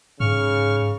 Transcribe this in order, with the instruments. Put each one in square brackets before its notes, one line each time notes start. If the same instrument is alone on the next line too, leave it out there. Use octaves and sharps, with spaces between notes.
[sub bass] G#2 [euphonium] C#3 [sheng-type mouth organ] C#6 F6